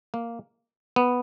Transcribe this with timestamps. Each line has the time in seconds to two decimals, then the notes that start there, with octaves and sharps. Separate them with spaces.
0.14 A#3
0.96 B3